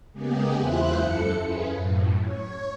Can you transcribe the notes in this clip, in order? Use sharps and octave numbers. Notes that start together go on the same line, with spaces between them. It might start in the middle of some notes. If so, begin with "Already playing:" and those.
C#3 G#3 A#3 B3 G4 G#4
E2 E4 F4 C5 E5 F#6
F#2 A4 C#7
C#4 E4 F4 G#4 B4
F#2 A2
C#5